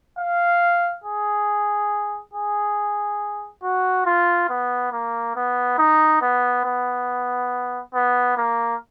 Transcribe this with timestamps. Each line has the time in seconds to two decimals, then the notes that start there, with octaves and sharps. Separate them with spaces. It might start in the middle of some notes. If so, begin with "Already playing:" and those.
0.19 F5
1.04 G#4
2.33 G#4
3.63 F#4
4.06 F4
4.50 B3
4.93 A#3
5.36 B3
5.78 D#4
6.22 B3
6.65 B3
7.94 B3
8.37 A#3